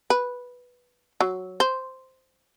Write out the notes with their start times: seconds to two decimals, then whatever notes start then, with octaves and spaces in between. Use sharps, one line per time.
0.10 B4
1.21 F#3
1.60 C5